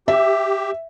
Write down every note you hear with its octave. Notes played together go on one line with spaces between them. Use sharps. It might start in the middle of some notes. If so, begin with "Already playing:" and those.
G4 E5